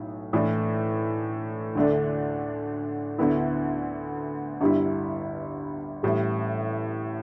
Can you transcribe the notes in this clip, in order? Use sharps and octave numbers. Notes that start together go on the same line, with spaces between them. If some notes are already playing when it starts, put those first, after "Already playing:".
Already playing: B1 A2
A2 E3 A3 D4
D2 D3 A3 D4
D2 D3 B3 E4
G1 G2 G3 E4
A1 A2 G3